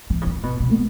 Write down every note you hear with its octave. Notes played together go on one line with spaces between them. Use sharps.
E3
C#3
D#3
B2
B2
B3